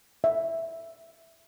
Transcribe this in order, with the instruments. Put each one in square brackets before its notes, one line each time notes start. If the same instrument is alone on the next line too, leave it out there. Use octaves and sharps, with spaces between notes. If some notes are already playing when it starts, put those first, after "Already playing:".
[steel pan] E5